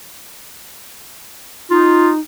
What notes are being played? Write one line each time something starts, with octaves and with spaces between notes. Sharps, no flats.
D#4 F4